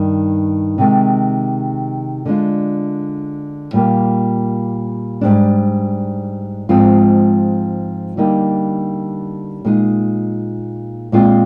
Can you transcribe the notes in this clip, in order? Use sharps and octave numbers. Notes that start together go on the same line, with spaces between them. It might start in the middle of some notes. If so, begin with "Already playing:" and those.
Already playing: G2 D#3 D#4
C3 D#3 G#3
D3 G#3 D4 F4
A#2 G3 A#3
G#2 G3 D4
G#2 F3 G#3 C4 F4
D3 G3 A#3 D#4
A#2 G#3 D#4
A#2 G#3 C4 F4